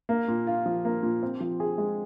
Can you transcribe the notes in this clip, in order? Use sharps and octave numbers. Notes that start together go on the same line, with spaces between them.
A#3
A#2
F4
F3
A#3
A#2
C4
F3
G#4
G#3